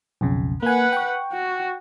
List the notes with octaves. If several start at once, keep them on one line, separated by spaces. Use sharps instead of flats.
B1 F2 C#3
A#3 B4 F#5 G#5
G5 C#6
F#4